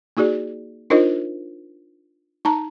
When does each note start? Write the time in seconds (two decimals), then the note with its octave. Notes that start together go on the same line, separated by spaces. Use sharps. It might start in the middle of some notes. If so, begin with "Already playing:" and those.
0.17 A#3 D#4 F#4 G#4 D5
0.90 D4 D#4 F4 A#4 C5 D#5
2.45 D#4 A5 A#5